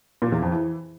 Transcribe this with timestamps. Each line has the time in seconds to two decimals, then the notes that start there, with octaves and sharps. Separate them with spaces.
0.22 A#2
0.32 E2
0.42 F2
0.52 E3